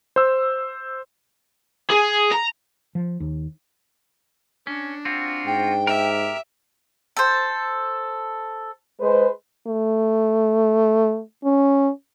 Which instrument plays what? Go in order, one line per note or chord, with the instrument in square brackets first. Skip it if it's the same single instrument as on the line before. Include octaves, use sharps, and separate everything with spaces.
[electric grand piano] C5 E6
[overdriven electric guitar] G#4
A#5
[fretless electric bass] F3
D#2
[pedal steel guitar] C#4 [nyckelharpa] D4
[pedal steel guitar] C4 F4 F#4
[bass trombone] G#2 [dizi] G5
[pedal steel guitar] G4 A#4 [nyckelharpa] E5
[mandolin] A4 C5
[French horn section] G#3 B4 C5
[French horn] A3
C#4